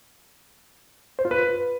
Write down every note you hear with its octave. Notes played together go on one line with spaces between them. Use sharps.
C5
F4
B4